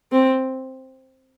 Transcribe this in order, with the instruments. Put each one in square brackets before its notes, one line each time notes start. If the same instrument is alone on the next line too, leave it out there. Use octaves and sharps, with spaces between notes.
[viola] C4